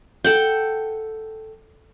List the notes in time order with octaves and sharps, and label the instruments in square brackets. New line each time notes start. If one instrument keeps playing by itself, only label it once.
[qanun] A4 F#5 G5